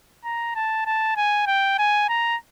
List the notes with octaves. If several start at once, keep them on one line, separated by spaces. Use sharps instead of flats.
A#5
A5
A5
G#5
G5
G#5
A#5